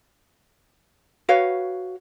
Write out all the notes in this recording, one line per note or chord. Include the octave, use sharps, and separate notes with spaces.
F#4 B4 C#5 F5